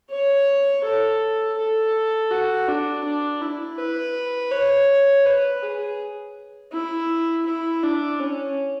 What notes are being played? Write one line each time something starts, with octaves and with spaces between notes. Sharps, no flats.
C#5
A4
A4
F#4
D4
D4
E4
B4
C#5
B4
G#4
E4
E4
D4
C#4